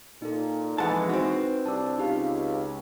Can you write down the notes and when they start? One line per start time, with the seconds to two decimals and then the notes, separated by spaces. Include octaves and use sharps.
0.22 A#2 D#4 A4
0.78 F2 E3 G#3 F#5 A5
1.09 C4 D#4 F#4 B4
1.66 C2 D4 A5 E6
1.98 C#2 D#4 G4 F5